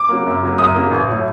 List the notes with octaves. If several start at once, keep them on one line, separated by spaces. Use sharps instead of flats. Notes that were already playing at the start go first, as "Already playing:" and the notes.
Already playing: D6
C#3 F#3 A#3
F#2
C#3 F#3 A#3
F#2 D#6
C#3 F#3 A#3
A1
A2 F#3